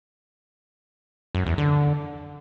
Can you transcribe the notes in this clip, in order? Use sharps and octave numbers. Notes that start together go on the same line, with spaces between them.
F#2
E2
D3